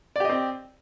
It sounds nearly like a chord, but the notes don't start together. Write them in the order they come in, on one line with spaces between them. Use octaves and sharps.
D5 G4 D#5 C4